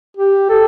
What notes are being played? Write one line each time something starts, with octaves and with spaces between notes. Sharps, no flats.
G4
A4